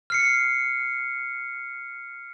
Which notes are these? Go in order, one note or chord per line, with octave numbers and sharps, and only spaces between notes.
F6 C7 C#7